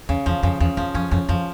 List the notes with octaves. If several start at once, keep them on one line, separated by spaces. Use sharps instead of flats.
E2 C#3
E2 F3
F2 C#3
E2 C#3
E2 F3
F2 C#4
F2 C#4
F2 F3